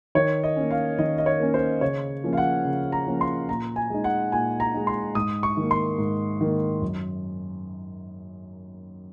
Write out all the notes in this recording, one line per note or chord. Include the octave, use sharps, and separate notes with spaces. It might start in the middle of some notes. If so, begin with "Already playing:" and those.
D#3 C#5
D#5
A#3 C#4
F5
D#3 D#5
D#5
C#5
A#3 C#4
C5
C#3 C#5
F3 A#3 C#4
F5
F#5
C#3
A#5
F3 A#3 C#4
C6
A#2 A#5
G#5
G#3 D#4
F#5
A#2 G#5
A#5
G#3 D#4
C6
G#2 D#6
C#6
D#3 A#3
C6
G#2
D#3 A#3
F#2